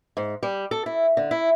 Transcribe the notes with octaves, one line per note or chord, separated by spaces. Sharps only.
G#2
G3
A4
E4
D3
E4